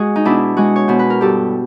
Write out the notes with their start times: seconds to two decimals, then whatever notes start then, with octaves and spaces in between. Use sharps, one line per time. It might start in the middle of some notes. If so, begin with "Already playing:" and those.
Already playing: G#3 F#4 G#4
0.16 D#4
0.25 B2 D4 E4
0.57 G#3 F#4 G#4
0.76 C#5
0.88 B2 C5
0.99 B4
1.10 A#4
1.21 G2 G4 A4